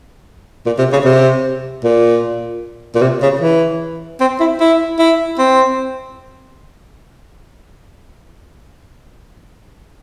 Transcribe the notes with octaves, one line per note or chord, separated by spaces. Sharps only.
A#2
C3
C#3
C3
A#2
A#2
C3
C#3
E3
C4
E4
E4
E4
C4